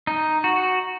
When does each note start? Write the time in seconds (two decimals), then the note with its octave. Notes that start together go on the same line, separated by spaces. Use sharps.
0.07 D#4
0.44 F#4